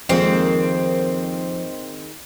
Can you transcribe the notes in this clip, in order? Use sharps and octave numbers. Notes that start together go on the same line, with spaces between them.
F2 D#3 G#3 A#3 C4